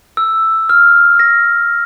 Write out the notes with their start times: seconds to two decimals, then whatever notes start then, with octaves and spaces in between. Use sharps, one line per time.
0.17 E6
0.69 F6
1.19 A#6